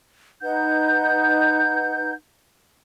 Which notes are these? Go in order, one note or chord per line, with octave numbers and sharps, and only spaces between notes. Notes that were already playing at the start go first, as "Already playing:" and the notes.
D#4 B4 F#5 G6